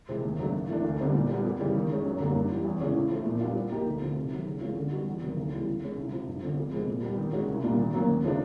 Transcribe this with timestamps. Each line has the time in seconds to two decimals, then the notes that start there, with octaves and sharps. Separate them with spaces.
0.09 C3 E3 G#3 C4
0.24 D#2
0.39 C#3 F#3 A3 D4
0.54 G#2
0.69 E3 A3 D4
0.84 D2
0.99 D3 G3 C4 D#4
1.14 A#2
1.29 G3 B3
1.44 F2
1.60 C#3 E3 G3
1.75 D#3
1.90 G#3 C#4
2.05 F#2
2.20 D3 G3 A#3
2.35 G2
2.50 E3 G3
2.65 E2
2.80 C#3 E3 G#3 C#4
2.96 A2
3.10 F3 A3
3.26 A#2
3.40 G3 B3 D4 F4
3.55 F3
3.71 A#3 D#4 G4
3.86 D2
4.02 D3 F3 A3
4.16 C3
4.31 D#3 F#3
4.46 C#3
4.61 E3 G#3 C#4 F4
4.77 D3
4.92 G3 B3 D#4 F#4
5.07 E2
5.22 C3 D#3 F#3
5.37 D2
5.52 C#3 E3 G3 B3
5.67 E3
5.82 G#3 C#4
5.97 C2
6.12 C3 F3
6.27 G2
6.43 D3 F3
6.57 F2
6.72 C3 F3 G#3
6.88 A#2
7.03 G3 B3
7.18 D#3
7.33 G#3 C#4 F#4
7.48 C2
7.64 A#2 G3 A#3 D4
7.78 D#3
7.93 F#3 A#3 C#4
8.08 D#2
8.24 C#3 F3 A3 D4